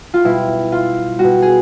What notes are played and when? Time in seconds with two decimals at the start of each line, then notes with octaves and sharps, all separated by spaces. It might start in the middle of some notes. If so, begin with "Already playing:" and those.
0.14 F4
0.24 B2 G3 E4
0.72 F4
1.19 B2 G3 F#4
1.42 G#4